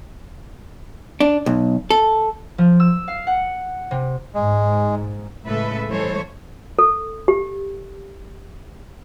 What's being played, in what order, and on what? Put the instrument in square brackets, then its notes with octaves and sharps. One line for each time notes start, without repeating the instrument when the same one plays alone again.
[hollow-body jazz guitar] D4
B1
A4
[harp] F3
E6
F5
F#5
C3
[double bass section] G#2 [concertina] G#3
[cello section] A2 C#3 G#3 A4 B4 E5
E3 G3 G#3 A4 C5 C#5
[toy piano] A4
G4